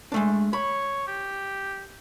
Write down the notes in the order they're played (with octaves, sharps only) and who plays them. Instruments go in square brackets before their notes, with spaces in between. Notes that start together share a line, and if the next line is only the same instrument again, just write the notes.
[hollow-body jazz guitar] G#3 A3 D4
[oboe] C#5 [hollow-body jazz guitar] B5
[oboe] G4